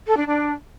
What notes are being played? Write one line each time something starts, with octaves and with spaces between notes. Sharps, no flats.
A4
D4
D4